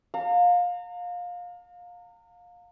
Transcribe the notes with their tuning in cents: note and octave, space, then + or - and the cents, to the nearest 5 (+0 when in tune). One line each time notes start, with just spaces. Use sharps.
F5 +25 A#5 -35